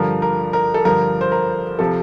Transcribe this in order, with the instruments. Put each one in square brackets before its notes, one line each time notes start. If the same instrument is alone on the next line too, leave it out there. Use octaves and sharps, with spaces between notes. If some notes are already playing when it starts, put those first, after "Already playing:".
Already playing: [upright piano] G2 D3 F3 A#4
A#4
A#4
A4
G2 D3 F3 A#4
C5
A#4
C3 F3 A4